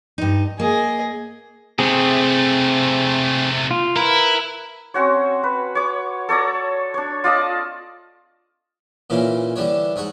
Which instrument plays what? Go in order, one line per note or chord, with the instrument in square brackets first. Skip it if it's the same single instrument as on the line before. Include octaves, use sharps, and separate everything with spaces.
[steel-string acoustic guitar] G2 D#4
[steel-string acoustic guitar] A#3 [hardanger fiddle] G#4 D#5
[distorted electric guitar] C3 A3 [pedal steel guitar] C4 G#4
[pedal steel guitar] F4
[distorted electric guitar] E4 [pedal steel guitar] A#4 B4
[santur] C4 C#4 F#4 C#5
B4
C#5 D6
A4 C#5 D5 A#5
D4 C#5
F4 D5 D#5 A5
[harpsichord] A#2 E3 A#3 C#4
D3 E3 G3 D4 C#5
G#2 C#5 F#5 C#6